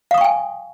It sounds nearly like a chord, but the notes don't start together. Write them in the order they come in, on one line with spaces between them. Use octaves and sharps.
F5 D#6 C#6 G5 G#5